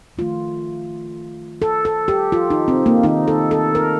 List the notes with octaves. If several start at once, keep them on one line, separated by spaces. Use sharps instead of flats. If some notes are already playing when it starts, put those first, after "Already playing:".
D#3 A3 F4
A4
A4
G4
F4
D#4
C4
A#3
D#3 A#3 D#4
A4
A4
A#4